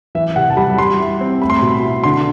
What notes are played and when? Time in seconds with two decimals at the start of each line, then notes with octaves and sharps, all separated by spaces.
0.15 E3 E5
0.36 C3 F#5
0.50 A5
0.57 G3 B5
0.78 G3 C6
0.99 E4
1.21 C4
1.42 A3 B5
1.50 C6
1.59 B2 B5
1.83 E4
2.04 D3 C6